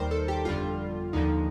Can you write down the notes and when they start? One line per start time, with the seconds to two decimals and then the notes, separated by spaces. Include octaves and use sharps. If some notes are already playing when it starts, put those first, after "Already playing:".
Already playing: D#2 D#3 G3 A#4 C5
0.11 A4
0.28 G4
0.45 G1 F2 D3 G3 F4
1.13 D#2 D3 F3 D#4